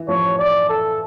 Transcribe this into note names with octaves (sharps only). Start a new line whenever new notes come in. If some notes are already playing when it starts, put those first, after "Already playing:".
Already playing: E3
F3 C#5
D5
A4